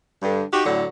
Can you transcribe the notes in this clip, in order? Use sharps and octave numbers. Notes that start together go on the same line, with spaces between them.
G2 D3
D#4 F#4 G4
A2 D3 F#3